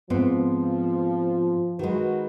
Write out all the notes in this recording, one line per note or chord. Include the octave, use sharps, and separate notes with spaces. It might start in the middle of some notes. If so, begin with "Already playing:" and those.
G#2 F3 B3 C4
D#3 G#3 F#4 B4